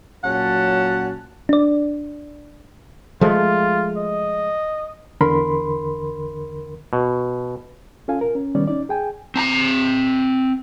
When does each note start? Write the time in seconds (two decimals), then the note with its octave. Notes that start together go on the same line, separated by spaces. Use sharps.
0.24 A#2 F#3 C#4 F#5 A5
1.49 D4 D5
3.21 F3 G#3 A3 F4
3.97 D#5
5.21 E2 D3 A#4 B5 C6
6.93 B2
8.08 C#4 F4 A4 F5 G#5
8.21 A#4
8.35 C#4
8.55 D#3 G3 B3 C#4 D5
8.67 C#4 D#4 D5
8.89 G#4 G5 G#5
9.36 C4 A5 A#5